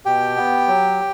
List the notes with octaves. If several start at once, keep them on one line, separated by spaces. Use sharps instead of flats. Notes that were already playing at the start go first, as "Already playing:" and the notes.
B2 G4 G5
B3
F#3